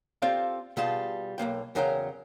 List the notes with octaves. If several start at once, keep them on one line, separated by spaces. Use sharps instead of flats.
C4 F4 G4 A4 D5 F5
B2 G3 F4 G#4 A5
B1 C#3 A#3 G5
E2 C#3 F#3 A#4 C#5 G5